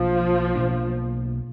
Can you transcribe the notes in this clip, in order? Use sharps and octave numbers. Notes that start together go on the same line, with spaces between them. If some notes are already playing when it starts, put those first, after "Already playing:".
Already playing: B1 B2 F3 A#3 D4
B1 B2 A#3 D4